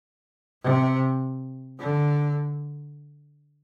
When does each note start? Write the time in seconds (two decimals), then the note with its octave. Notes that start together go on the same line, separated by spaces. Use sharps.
0.62 C3
1.79 D3